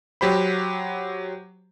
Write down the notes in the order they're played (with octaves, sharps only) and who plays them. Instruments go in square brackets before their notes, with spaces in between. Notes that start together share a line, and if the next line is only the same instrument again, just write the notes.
[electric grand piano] F#3 G4 C5 B5